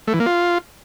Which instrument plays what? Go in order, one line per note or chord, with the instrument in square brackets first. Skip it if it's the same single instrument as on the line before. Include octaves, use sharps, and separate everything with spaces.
[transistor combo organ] A3
E3
A#3
F4